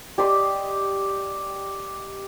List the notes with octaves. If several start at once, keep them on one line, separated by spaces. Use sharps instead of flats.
G4 D5 D#5 C6